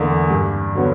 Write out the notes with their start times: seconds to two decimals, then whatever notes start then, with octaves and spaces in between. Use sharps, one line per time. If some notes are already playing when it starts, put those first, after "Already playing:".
Already playing: E2 D3 A#3 D5
0.30 G2
0.75 D3 F#3 B3